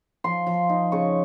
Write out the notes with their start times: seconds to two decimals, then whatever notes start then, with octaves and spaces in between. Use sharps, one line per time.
0.24 F3 C6
0.47 F3
0.69 D#4
0.92 C#3 C#6